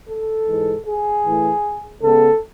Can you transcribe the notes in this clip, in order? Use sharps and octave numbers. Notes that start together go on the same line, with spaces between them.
A4
G#2 E3 G#3
G#4
A2 E3 A3
C#3 G#3 B3 A4